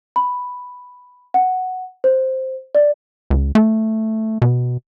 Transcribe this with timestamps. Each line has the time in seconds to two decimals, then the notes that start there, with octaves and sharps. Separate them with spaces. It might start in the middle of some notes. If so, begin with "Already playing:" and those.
0.16 B5
1.34 F#5
2.04 C5
2.75 D5
3.30 C#2
3.55 A3
4.42 B2